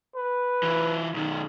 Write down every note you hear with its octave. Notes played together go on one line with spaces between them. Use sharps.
B4
E3 F4
B1 D#3